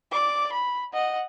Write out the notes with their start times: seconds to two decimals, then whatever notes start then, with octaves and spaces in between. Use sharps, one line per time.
0.12 D5 D6
0.53 B5
0.94 D#5 F#5